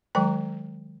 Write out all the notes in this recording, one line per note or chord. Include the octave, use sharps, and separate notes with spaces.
D#3 F#3 G#3 G5 A#5